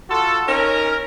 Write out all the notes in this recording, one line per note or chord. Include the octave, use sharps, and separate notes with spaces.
F4 F#4 A4
C#4 D#4 A#4